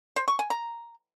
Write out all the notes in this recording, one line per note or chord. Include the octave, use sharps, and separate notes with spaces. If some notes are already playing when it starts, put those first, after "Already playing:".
C5
C#6
G#5
A#5